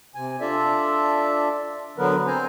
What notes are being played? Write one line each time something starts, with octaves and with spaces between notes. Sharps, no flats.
C3 G#5
D4 F4 A4 D5 E5
D3 F#3 B3 A#4 B4
C4 C5 G#5 A#5